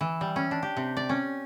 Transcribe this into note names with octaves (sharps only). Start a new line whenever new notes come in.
E3
G3
C#4
D4
G4
C3
D5
C#4